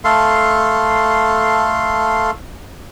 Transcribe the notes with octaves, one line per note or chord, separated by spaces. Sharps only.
A3 A4 F5 C6